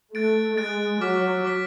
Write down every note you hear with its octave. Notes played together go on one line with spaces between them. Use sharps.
A3 F#6 A6 D7
G#3 F#6 A6 D7
F#3 D6 F6 B6
D6 F6 B6